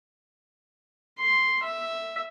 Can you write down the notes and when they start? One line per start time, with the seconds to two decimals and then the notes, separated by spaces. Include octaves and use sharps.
1.18 C6
1.62 E5